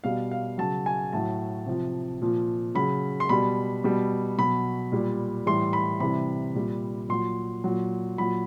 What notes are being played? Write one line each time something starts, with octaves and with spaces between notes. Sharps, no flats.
B2 G3 F5
F5
C#3 F#3 A5
G#5
A2 F#3 A5
C3 F3
A#2 F3
C#3 F#3 B5
C6
B2 G3 B5
B2 G3
B2 F#3 B5
A#2 G3
A2 E3 G3 C6
B5
C3 E3 G3 B5
A#2 G3
A#2 F#3 C6
A#2 F#3
A#2 F#3 B5